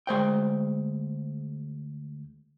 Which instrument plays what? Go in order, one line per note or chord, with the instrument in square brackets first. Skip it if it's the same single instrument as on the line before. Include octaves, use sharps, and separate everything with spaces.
[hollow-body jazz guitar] D2 G#3 C5 G5